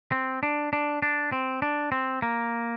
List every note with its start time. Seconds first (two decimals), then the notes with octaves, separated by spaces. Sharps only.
0.12 C4
0.43 D4
0.73 D4
1.02 D4
1.32 C4
1.62 D4
1.92 C4
2.22 A#3